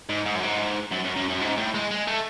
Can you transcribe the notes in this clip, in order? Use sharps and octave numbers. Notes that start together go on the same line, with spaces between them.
G#2
G#2
F#2
G#2
F#2
F#2
F#2
F#2
G#2
A2
G#3
G#3
A3